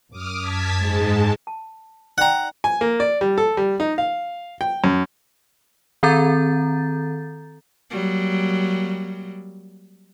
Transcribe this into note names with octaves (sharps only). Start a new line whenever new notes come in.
F#2 D6 D#6 F6
A5 G#6 B6
G#2 G#3 A5
A5
D#4 D5 F#5 G5 A#5
G#5
A#3
D5
G3
A4
G3
D#4
F5
G5
F#2
D#3 C4 A4 A#5 G6 A6
F#3 G3 A#3